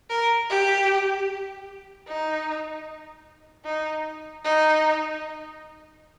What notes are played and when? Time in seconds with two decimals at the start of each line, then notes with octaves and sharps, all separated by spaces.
0.10 A#4
0.50 G4
2.07 D#4
3.65 D#4
4.44 D#4